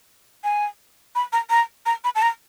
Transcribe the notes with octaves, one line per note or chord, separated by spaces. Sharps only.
G#5
B5
A#5
A#5
A#5
B5
A5
A#5